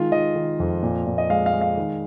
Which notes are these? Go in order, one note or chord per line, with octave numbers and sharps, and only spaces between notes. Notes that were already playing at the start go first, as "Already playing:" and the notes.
Already playing: D#3 G#3 F4
D#3 D#5
D#3
F2
A#2
A#2
D#5
G#3 F5
F5
G#3
F5
D#3